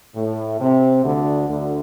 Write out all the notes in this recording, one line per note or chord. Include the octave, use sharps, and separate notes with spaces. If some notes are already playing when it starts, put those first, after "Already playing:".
A2
C3
D2 D3
D2 D3